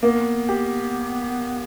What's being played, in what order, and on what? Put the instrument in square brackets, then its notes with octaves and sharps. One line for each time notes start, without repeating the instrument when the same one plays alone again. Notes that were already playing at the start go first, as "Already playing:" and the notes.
[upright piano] A#3 [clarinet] B3
[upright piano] G4